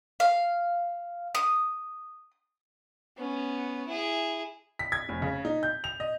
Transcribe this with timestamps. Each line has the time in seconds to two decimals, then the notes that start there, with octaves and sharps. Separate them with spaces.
0.20 F5
1.35 D#6
3.17 B3 C#4
3.87 E4 G#4
4.79 B6
4.92 G#6
5.09 F1
5.22 C#3
5.45 D#4
5.63 G6
5.84 F7
6.00 D#5